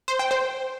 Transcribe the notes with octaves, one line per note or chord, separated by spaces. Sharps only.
C5
G5
C5